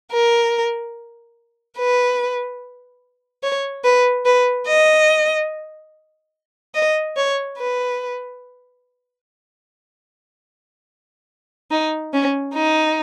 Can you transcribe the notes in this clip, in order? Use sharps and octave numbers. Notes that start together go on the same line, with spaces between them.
A#4
B4
C#5
B4
B4
D#5
D#5
C#5
B4
D#4
C#4
D#4